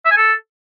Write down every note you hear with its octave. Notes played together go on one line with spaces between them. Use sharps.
E5
G#5
A4